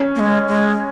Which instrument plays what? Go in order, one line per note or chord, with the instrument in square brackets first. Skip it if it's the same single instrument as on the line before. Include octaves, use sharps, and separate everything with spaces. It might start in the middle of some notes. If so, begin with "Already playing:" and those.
Already playing: [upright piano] C#4
[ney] A#3
G#3
G#3